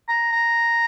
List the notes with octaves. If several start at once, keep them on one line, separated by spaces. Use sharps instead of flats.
A#5
A#5